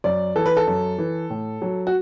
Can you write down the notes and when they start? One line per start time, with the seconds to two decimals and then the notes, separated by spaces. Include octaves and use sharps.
0.04 F#2 D5
0.36 E3 A4
0.46 B4
0.57 A4
0.67 F#2
0.98 E3
1.30 A2
1.62 F#3
1.87 F#4